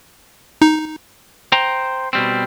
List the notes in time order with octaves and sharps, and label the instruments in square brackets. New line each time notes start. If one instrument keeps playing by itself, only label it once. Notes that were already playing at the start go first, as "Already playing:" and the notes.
[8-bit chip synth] D#4
[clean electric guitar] C5 G5 A#5
B2 G3 C4